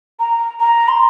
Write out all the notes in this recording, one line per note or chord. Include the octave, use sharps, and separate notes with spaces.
A#5
A#5
C6